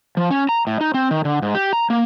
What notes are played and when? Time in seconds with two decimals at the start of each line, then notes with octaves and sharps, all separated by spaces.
0.17 F3
0.31 C#4
0.49 A#5
0.67 A2
0.81 D#4
0.94 C4
1.11 D#3
1.25 D3
1.42 G#2
1.55 G4
1.73 A#5
1.90 A#3